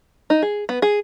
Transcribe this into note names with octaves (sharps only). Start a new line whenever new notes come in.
D#4
G#4
B3
G#4